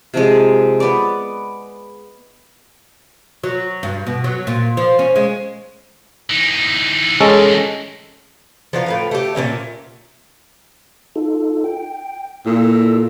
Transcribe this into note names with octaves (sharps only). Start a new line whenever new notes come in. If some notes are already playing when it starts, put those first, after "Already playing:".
C3 F3 G#3
B3 D5
F#3
G2
B2
F#3
A#2
F3
C#4
G#3
E3 D#4
G#3 C#4 A4
F3 B3 F4 A#4
A2 B4 F5
A3 G4
A#2 E3 C#4 E5
D#4 F4 A4
G5
A#2 E4 A4 E6